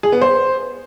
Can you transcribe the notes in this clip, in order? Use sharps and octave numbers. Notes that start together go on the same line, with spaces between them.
G#4
B3
C5